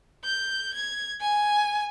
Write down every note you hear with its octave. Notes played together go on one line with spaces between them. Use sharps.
G6
G#6
G#5